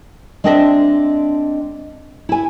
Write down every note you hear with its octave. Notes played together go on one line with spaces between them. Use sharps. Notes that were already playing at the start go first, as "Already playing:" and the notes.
G#3 C4 D4 E4 D#5 E5
E4 G#5